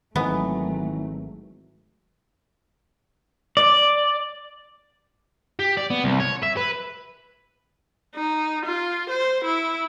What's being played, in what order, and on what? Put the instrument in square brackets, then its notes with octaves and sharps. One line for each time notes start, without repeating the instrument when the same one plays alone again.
[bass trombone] G#1 [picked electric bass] D#3 E3 [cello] F#3 A3 [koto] B3
[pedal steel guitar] D5
[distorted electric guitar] G4
D5
B3
C2
C#5
E5
B4
[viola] D#4
F4
C5
E4